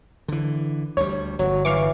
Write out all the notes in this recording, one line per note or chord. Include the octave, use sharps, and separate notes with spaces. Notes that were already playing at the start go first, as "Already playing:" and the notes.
D3 E3
D2 G3 C#5
G1 F#3
E3 F5 C#6 D6